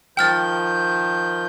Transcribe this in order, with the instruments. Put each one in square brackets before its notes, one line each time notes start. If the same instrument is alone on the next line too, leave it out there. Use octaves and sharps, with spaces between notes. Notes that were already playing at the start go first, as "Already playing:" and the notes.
[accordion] D#3 F3 G6 [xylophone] G5 F6 A6